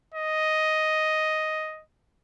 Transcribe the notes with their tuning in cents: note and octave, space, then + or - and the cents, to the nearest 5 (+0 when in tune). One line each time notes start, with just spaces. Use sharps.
D#5 +5